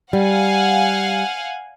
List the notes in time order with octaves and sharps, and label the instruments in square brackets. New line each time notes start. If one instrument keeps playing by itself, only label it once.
[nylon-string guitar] G3 [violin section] F5 F#5 G#5